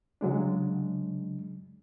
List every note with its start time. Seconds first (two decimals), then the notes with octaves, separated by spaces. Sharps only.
0.21 C#3 F#3 G#3 D4